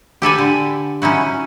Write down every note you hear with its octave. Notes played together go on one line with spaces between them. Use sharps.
G4 A4 B4 G#5
D3
C#4 D#4 E4 F#4